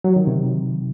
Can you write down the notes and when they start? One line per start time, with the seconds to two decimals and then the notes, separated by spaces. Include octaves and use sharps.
0.04 F#3
0.16 D#3
0.27 C3